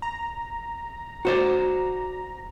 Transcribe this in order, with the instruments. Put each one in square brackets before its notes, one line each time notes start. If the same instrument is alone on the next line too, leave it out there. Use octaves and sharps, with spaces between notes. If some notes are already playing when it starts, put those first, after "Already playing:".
[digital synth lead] A#5
[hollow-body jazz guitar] F#4 C5 D5